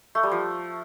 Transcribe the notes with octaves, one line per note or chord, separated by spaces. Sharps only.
A3
G3
F3